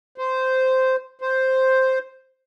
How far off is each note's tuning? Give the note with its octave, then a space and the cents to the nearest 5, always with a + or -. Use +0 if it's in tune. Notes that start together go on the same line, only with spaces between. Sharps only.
C5 -10
C5 +0